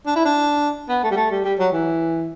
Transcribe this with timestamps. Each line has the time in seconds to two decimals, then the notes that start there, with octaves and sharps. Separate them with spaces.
0.06 D4
0.15 E4
0.25 D4
0.89 B3
1.03 A3
1.11 G3
1.16 A3
1.30 G3
1.44 G3
1.59 F#3
1.72 E3